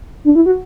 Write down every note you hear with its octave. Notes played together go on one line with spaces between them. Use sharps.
D4
E4
F#4